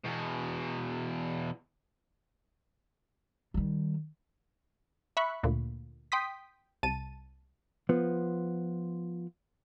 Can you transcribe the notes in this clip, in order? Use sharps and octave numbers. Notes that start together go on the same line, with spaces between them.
E2 B2
D#3 G3
E5 B5 C#6 F#6
D2 A#2
G5 C6 D#6 B6
C2 A5 D#7
F3 B3